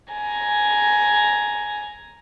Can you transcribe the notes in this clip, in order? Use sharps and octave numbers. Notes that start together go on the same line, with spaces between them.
G#5 A#5